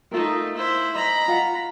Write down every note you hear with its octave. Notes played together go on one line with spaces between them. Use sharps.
A3 D#4 F4 A#4
E4 C5
D#5 A#5 B5
F4 F5 F#5